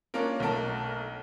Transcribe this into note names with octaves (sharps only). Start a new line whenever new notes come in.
A#3 C#4 D4 F4 A#4
B1 A3 A#4 A5